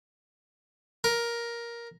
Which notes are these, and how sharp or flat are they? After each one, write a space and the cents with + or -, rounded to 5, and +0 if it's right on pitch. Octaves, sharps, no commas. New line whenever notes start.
A#4 +10